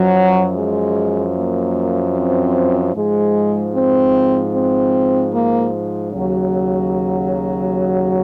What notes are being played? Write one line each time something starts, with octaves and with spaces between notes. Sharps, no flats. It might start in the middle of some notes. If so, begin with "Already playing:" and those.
Already playing: F#2 F3 F#3
G#3
A#3
C4
G#2 F3 G#3
C4
C4
A#3
D#2 C#3 F#3